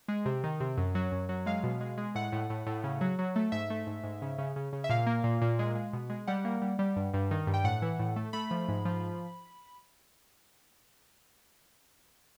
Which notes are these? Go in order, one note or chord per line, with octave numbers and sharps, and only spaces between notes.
G#3
C3
D#3
C3
F#2
F#3
F#2
F#3
G#3 F5
B2
G#3
G#3
A2 F#5
A2
A2
A2
C#3
F#3
F#3
A3
G#2 E5
A3
G#2
G#2
C#3
C#3
C#3
C#3
E5
A#2 F5
A#3
A#2
A#2
G#3
G#3
B2
G#3
G3 F#5
A#3
G3
G3
G2
G2
D#3
G2
G5
A2 F#5
E3
A2
A3
A3 B5
F3
G#2
F3